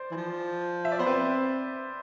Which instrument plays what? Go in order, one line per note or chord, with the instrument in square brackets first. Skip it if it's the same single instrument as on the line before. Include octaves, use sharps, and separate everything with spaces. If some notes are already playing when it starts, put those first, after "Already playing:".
Already playing: [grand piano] C5 D5
[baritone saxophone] E3
F3
[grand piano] E5
D5
[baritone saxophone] B3 [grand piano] C5
[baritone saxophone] C4 [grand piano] B4